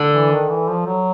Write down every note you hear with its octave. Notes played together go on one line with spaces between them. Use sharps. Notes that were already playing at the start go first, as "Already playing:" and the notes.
Already playing: D3
E3
D#3
E3
F3
F#3